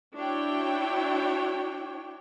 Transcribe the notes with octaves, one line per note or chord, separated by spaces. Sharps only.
D4 E4 F#4 C#5 G5